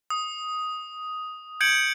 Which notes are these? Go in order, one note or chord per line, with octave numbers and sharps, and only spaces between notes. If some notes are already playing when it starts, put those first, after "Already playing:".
D#6
G6 G#6 C#7 D7 F#7